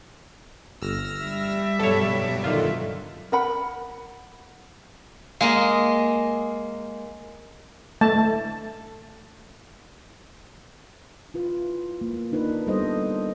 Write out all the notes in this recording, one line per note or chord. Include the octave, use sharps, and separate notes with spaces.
G1 E6 F6 A#6
G3 E5
G2 B2 F#3 A4 C#5
D3 D#3 F4
A#4 F#5 B5
G#3 A#3 D#5 F5
A3 A5
E4 F4 B4
A#3
D4 D#4 A#4 B4
G3 B3 A4 B4 C5 D#5